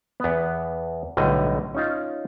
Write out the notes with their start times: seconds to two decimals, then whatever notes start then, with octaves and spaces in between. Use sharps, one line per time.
0.20 E2 B3
1.17 B1 A2 D3 G3 D#5
1.75 C#4 D#4 F4